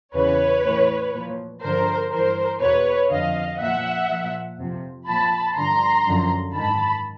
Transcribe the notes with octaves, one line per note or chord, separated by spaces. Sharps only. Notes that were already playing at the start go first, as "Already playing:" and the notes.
E2 C#3 E3 B4 C#5
A2 E3
A#2 F3
G2 D3 F3 A#4 C5
G2 E3 A#4 C5
E2 B2 B4 C#5
F2 D3 F3 D#5 F5
A#2 F3 E5 F#5
A#2 F3
F2 C3 F3
A#2 F3 A5 B5
G2 D3 F3 A#5 C6
F#2 D3 F3
G#2 D#3 A5 B5